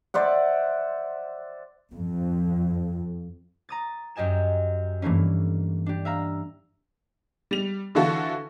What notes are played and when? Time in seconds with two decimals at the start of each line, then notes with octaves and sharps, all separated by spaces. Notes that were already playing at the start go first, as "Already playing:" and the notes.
0.14 C5 D5 E5 F#5
1.93 F2
3.69 A#5 D#6 A6
4.16 F#2 G4 D#5 G#5 E7
5.02 G2 E3 A3 A#3 C#4
5.86 D4 G4
6.05 E5 F5 A#5
7.51 G3 F7
7.95 D3 E3 F4 F#4 A4